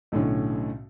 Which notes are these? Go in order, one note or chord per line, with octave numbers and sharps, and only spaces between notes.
B1 A2 D3 C#4